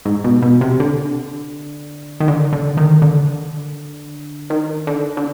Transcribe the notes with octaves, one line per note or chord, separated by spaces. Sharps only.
G#2
B2
B2
C3
D3
D#3
D3
D3
D#3
D3
D#3
D3
D3